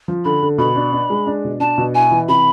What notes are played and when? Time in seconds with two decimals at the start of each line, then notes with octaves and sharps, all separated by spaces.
0.08 F3
0.25 D3 B5
0.42 D3
0.58 B2 B5
0.76 D4
0.92 D4
1.10 G#3
1.27 D4
1.44 B2
1.60 D4 A5
1.78 B2
1.95 E4 G#5
2.11 E3
2.28 C3 B5